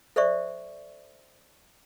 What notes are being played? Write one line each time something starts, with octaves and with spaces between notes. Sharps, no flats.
A4 C5 D5 E5 C#6